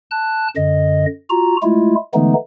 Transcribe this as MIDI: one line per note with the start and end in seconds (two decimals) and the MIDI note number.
0.11 0.48 81
0.11 0.48 90
0.56 1.06 42
0.56 1.06 50
0.56 1.06 75
1.30 1.57 65
1.30 1.57 66
1.30 1.57 82
1.62 1.95 56
1.62 1.95 57
1.62 1.95 64
1.62 1.95 65
2.14 2.34 50
2.14 2.34 52
2.14 2.34 56
2.14 2.34 57
2.14 2.34 59
2.14 2.34 63